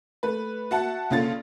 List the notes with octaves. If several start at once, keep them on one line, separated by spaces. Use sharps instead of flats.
A3 B4
F#4 E5 F#5 A5
A#1 C#3 C#4 F4 A4 A6